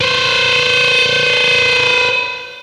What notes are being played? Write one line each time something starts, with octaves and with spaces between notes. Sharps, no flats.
B4 C5